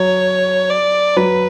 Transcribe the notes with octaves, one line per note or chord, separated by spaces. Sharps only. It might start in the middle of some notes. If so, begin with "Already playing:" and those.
Already playing: F#3 C#5
D5
F#3 B4